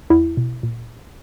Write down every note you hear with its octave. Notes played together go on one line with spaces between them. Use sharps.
E2 E4
B2
A#2